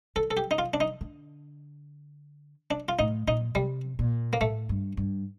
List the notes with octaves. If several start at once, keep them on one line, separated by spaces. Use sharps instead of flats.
D#3 A4
A4
G4
D#4
F4
D4
D#4
D3
D4
F4
A2 D#4
A#2 D#4
C3 G3
A#2
A#3
A2 A3
G2
G2